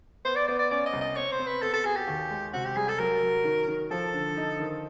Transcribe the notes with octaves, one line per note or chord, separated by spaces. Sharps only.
B3 C5
D5
B3 D5
D5
C#4 D5
D#5
C2
D#5
C4 C#5
C5
C4
B4
B3 A4
A4
F#4 G#4
G4
D#2
G#3
C3 F#4
G4
G3 G#4
A4
F#3 A#4
F#3
D#3
D#3
F3 A4
D3
D#4
D#3